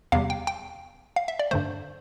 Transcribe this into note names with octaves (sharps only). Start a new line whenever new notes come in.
E2 C3 G3 F5
G5
G5
F5
E5
D5
G2 D3 A3 C5